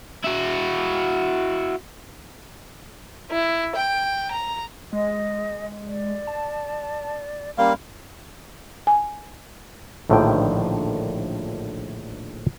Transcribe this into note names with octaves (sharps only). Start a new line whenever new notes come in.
E4 F#4
E4
G5
A#5
G#3 D#5
D5
A5
G3 A#3 C#4 F5 C6
G#5
A#1 A2 D3 D#3 F3 G5